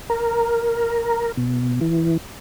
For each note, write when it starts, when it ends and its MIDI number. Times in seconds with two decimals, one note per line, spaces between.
0.10 1.32 70
1.37 1.80 47
1.81 2.17 52